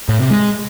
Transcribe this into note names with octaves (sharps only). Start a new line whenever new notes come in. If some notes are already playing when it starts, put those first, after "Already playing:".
A2
C3
G#3